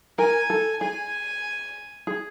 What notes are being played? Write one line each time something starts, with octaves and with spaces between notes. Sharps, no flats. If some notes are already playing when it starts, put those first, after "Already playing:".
A#4 G#5
A4
G#4 G#5
G#4